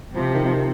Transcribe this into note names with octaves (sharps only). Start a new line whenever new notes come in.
C3 F3
D#3
F3
D#3